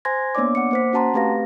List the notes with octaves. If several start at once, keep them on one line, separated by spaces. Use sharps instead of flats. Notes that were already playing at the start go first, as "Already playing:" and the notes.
C5 G#5 C6 G#6 A#6
A#3 B3 D4 C#5 D5 D6
F#5 D6 C#7
A#3 C5 B6
C#4 F#4 F#5 A5 A#5 C6
A3 C4 G4 B4 F5 A#6